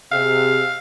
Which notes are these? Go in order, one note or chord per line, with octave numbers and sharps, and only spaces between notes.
C3 G#4 F5